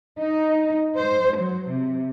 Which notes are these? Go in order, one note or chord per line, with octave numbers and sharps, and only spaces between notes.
D#4
C5
F#3
C3